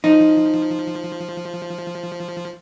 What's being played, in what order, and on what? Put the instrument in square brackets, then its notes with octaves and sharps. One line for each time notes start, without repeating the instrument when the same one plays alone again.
[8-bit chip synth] F3 [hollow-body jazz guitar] D#4